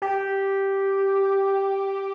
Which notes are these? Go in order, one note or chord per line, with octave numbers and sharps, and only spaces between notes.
G4